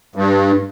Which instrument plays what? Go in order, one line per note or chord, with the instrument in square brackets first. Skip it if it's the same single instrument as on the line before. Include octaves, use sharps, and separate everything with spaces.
[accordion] G2